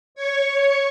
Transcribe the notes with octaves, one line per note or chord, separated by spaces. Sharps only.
C#5 C#6